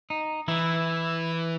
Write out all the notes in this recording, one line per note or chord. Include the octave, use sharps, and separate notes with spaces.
D#4
E3 E4